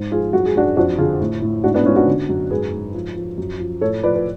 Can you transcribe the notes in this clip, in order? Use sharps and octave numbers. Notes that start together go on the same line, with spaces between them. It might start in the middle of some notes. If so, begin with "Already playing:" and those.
Already playing: G#2
F3 F4 G#4
F#2 F#4
G#4
F#2 D4 F#4
F2 D4 F#4
D3 F4 G#4
A2
A2
G#2 D4 F#4
B3 D4
G#2 C#4 F4
D4 F#4
D3
F#2
G#2 G#4 B4
G#2
F3
F3
F#2
F3
A2 A4 C#5
F3 B4 D5
B4